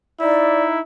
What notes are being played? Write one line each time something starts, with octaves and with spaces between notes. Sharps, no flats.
D#4 E4 D5